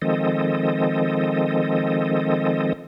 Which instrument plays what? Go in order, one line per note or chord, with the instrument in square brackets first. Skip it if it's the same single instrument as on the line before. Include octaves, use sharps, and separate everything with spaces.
[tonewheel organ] D#3 F3 G#3 C4 A4 D#5